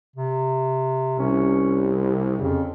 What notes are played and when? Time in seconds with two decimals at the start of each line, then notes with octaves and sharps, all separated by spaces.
0.16 C3
1.19 C2 C#4
2.39 F2 C#3